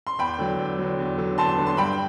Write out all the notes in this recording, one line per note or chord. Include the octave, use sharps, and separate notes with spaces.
C6
E2 G5 B5
D3 F#3
E2
D3 F#3
E2
D3 F#3
E2 A5 C6
D3 F#3
C6
G2 G5 B5